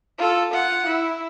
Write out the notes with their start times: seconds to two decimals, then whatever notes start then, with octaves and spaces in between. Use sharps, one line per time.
0.18 F4 A4
0.52 F4 F#5
0.86 E4